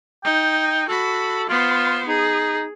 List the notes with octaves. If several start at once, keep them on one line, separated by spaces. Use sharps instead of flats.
D#4 G5
F#4 A4 B5
B3 F4 C5
D#4 G#4